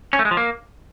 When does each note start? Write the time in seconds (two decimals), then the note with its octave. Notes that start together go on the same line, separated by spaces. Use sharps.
0.13 C#4
0.19 A3
0.25 G#3
0.31 F3
0.37 A#3